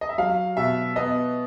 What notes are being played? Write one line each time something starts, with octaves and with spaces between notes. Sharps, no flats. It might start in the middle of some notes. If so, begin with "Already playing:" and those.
D#5
E5
F#3 F5
B2 E5
B3 D#5